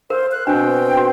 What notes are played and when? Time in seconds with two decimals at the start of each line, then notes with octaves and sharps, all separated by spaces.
0.10 A#4 C5 F5
0.32 F#6
0.47 B2 C4 D4 G5
0.97 F#4